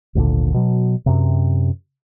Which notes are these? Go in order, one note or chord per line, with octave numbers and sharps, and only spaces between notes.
G#1 D2 A#2 D3
B2 F#3
F#2 C3